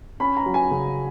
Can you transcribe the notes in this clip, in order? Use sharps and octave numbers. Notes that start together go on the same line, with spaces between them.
C#4 B5
A#5
F#3
G#5
C#3